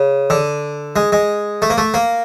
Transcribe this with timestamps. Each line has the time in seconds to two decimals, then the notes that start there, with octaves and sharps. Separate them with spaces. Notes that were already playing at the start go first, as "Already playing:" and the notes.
Already playing: C#3
0.30 D3
0.96 G#3
1.12 G#3
1.62 A3
1.70 A#3
1.78 A3
1.94 A#3